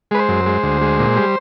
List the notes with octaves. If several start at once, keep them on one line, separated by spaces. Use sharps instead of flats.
G#3 B4
C5
F#2
G#3
D2
G#3
A#2
G3